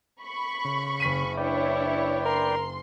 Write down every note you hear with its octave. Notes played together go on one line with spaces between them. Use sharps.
B5 C#6
C#3
F#1 B6 D#7
D4 E4 B4 C#5 D5 G5
A#4 C6